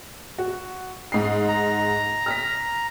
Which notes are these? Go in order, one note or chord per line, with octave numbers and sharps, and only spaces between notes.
F#4
G#2 C7
A#5
F6 A#6 B6